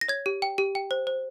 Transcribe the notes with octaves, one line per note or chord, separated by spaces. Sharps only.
A#6
C#5 G#6
G4
G5
G4
G5
C5
C5